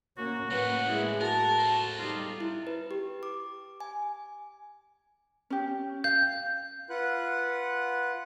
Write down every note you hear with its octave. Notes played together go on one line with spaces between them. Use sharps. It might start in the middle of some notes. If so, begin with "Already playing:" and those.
A#3 C#4 F#4
A2 F#3 A#3 B4 F#5
G#3 E4
F#4 A#4 A5
A4 C5
G3 D#4 F4 G4
E4
B4
G4
D6
G#5
C#4 G4
F5 G6
F4 B4 F#5 F#6